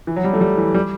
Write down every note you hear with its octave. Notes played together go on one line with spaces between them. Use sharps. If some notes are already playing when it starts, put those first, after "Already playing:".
E3
F#3
G3
A3
G3
E3
G3